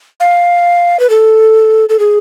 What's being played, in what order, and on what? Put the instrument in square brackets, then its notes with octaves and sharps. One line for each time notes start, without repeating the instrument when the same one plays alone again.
[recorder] F5
B4
A4
A4
G#4